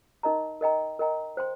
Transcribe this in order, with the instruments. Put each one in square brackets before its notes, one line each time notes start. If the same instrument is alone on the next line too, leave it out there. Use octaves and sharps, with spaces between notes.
[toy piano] D#4 A#4 D#5 A#5
A#4 D#5 G5 A#5
A#4 D#5 G5 A#5
C5 G5 C6